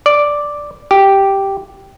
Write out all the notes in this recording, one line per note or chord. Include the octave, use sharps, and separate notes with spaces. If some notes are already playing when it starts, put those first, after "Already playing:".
D5
G4